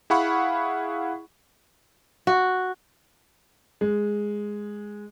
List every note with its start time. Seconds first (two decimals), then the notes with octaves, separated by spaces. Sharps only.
0.10 E4 G#4 F5 F#5 B5 C#6
2.27 F#4
3.81 G#3